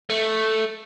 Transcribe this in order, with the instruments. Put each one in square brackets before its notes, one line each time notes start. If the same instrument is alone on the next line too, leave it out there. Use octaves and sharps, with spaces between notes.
[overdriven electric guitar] A3